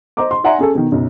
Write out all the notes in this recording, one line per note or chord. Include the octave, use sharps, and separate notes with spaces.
C5 D#5 A#5 D6
C6
D5 E5 F#5 G#5 A#5 C6
C#4 G#4 A4
B2 D#3
B1 F#2 C#3